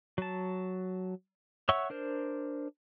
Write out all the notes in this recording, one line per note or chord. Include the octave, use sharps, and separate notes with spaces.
F#3 A5
C#5 E5 F#5 C#6 E6
D4 A#4 C5